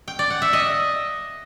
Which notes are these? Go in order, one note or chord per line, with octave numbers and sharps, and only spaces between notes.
G5
D5
F#5
E5
D#5